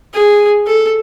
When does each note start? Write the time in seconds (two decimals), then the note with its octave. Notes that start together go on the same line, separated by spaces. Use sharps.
0.14 G#4
0.67 A4